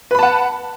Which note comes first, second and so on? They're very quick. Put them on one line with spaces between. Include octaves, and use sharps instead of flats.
B4 B5 A5 F#5